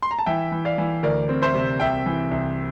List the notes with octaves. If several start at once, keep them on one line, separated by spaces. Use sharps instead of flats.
C6
A#5
A5
E3 E5 G5
E3
D5 F5
E3
D2 A#4 D5
C4
C5 E5
C3
C2 E5 G5
E3
C2